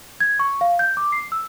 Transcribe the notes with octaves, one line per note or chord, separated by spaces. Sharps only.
G#6
C#6
F5
G6
D6
C7
E6